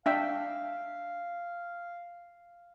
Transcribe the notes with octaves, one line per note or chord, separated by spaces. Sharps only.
D4 E5 F5 G5